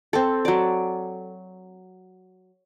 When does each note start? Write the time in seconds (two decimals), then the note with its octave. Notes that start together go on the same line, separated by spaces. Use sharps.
0.13 C4 A4
0.45 F#3 D5